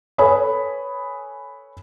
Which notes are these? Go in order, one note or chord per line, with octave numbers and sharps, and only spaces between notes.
A4 B4 C#5 G#5 B5 D#6